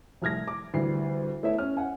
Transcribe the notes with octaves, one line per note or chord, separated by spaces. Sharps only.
F1 C2 F6 G#6 A#6
D6
D2 E3 G3 C7
A3 B3 E4 C#5 E5
C#4 F6
F#5 G#5